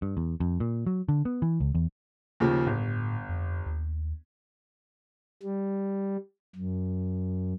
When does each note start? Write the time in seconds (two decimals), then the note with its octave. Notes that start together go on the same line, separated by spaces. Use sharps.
0.02 G2
0.17 E2
0.40 F2
0.60 A#2
0.87 F#3
1.09 D3
1.25 B3
1.42 E3
1.60 C#2
1.75 E2
2.40 D#2 C#3 F3
2.67 G1 A2
3.29 F2
3.66 D#2
5.43 G3
6.55 F#2